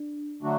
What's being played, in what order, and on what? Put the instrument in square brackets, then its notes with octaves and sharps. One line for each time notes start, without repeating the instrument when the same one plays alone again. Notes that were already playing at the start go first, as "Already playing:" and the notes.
Already playing: [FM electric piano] D4
[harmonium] D3 F#3 A3 D4 F#4